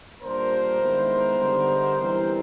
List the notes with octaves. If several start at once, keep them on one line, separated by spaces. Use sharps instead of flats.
A#2 G3 A#3 D4 A#4 C5
D#3 G#3 B3 E4
D3 G3 B3 D#4
E3 G3 C4 E4 A#4 C5